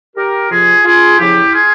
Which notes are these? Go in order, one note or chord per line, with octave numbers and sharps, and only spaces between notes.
G4 A#4
F2 C3 F3 F4 G#4
F4 G#4
E2 C#3 F3 E4 G4
F4 G#4